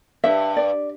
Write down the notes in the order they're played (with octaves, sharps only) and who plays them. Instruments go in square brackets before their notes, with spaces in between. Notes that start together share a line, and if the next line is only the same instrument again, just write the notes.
[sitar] G2 [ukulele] E5
[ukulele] D5